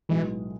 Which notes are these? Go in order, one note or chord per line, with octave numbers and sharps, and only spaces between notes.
B1 A2 E3 G#3 B3 F#4